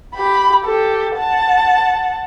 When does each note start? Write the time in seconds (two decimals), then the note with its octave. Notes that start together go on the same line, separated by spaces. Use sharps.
0.15 G4 B5
0.65 G4 A4
1.17 F#5 A5